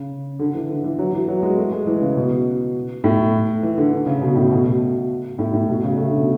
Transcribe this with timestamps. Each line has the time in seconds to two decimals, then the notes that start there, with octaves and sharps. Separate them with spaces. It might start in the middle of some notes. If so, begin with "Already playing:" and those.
Already playing: C#3
0.39 D3
0.54 E3
0.69 D3
0.84 E3
0.99 F#3
1.13 E3
1.28 F#3
1.43 G#3
1.57 A3
1.72 G#3
1.86 E3
2.01 C#3
2.16 B2
3.04 A2
3.63 E3
3.78 D3
3.92 D3
4.06 C#3
4.22 B2
4.36 A2
4.52 B2
4.66 B2
5.39 A2
5.53 A2
5.68 B2
5.84 C#3
5.98 A3
6.08 D3
6.18 B2